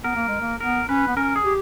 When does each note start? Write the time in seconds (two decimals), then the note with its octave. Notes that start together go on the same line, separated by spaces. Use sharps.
0.04 B3 A#4
0.16 A#3
0.28 G#3
0.41 A#3
0.60 B3 A#4
0.89 C#4 B4
1.08 B3
1.16 C#4 A#4
1.36 G#4
1.45 G4